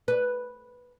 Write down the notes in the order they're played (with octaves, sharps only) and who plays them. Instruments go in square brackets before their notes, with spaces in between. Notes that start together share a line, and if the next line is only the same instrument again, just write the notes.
[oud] B4